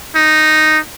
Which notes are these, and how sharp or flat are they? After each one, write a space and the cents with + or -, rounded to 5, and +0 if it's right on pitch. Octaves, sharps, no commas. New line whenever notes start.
D#4 -5